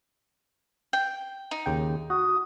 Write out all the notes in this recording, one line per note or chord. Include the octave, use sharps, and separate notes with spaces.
G5
D#4
D#2 C#3 G5
F#4 D#6